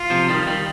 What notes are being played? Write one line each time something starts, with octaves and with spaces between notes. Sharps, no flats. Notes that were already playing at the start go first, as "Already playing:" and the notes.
Already playing: F4
C3 F3
D#3 G3
D#3 G3